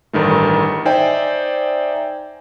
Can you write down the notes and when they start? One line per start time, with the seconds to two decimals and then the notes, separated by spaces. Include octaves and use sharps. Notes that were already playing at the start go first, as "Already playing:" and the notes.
0.13 A1 G2 D#3 A3
0.85 D#4 C5 D5 E5 G5 G#5